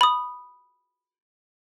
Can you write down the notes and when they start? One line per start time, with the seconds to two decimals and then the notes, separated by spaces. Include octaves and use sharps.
0.01 B5 D#6